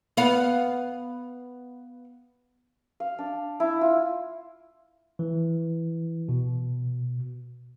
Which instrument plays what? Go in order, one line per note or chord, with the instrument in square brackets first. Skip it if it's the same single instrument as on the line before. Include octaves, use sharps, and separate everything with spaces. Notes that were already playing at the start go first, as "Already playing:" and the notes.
[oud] B3 F5
[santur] F5
D4
E4
F4
[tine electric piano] E3
B2